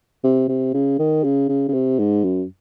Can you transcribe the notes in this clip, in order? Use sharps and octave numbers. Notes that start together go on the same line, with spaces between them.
C3
C3
C#3
D#3
C#3
C#3
C#3
C3
G#2
F#2